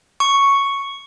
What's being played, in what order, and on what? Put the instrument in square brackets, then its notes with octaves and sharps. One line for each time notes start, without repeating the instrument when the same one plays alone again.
[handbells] C#6